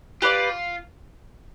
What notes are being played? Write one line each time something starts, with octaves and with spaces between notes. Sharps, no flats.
F4 G4 B4 D5